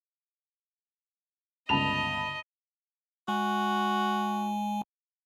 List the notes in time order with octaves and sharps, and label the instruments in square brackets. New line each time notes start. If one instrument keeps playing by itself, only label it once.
[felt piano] G1 C#2 [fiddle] D#5 [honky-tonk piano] A5 B5 F7
[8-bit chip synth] G#3 G#5 [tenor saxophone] F#4